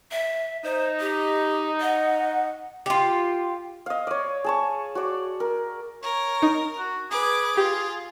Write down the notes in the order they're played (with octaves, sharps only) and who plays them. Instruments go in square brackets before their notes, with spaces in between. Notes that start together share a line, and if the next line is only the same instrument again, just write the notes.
[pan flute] E5
[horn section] D#4 [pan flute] C5
[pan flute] G4
[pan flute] D#5 [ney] F#5
[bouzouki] F4 G4
[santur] D#5 F5
C#5 D5
G#4 A5 C#6
F#4 D5
A#4
[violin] A#4 [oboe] C#5
[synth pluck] D#4
[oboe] F#4
[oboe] G#4 [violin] B4 D6
[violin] F4 [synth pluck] G4